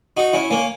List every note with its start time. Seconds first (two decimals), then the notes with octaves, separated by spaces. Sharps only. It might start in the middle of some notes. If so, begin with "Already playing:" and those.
0.17 D#4 F#4
0.33 C#4 E4
0.50 A#3 C#4